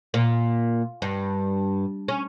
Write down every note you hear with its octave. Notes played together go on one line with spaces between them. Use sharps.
A#2
G2
C#4